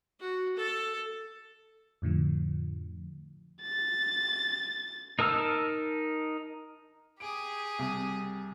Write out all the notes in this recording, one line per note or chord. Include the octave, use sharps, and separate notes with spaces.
F#4
A4
F2 A2 D3 F3
A6
D#4 A#4 A5 E6 F6
G4 G#4 D7
C2